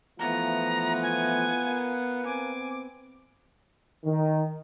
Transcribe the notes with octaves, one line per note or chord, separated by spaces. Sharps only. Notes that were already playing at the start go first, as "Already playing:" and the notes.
E3 F3 A3 B3 F4 A#5
G#5
A#4 F5
C4 G#5 D6
D#3